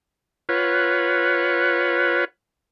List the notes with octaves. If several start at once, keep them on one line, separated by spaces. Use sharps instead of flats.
F4 B4 C#5 F#5